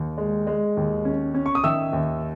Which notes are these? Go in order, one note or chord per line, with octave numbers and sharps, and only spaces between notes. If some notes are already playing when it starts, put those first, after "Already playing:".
Already playing: D#2
G#3
G#3
D#2
C#4
C#4
C#6
D#6
D#3 E5 E6
D#2